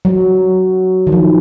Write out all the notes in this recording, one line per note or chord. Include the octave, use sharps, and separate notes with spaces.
F#3
D#3
F3